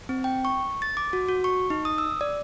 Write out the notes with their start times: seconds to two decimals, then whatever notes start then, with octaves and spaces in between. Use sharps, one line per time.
0.09 C4
0.24 G5
0.45 C#6
0.82 A6
0.97 D6
1.13 F#4
1.29 F#4
1.44 C#6
1.70 D#4
1.85 D#6
1.98 E6
2.21 D5